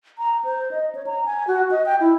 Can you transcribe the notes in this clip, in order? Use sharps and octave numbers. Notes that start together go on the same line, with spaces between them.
A#5
C5
D#5
C#5
A#5
G#5
F#4
D#5
G5
E4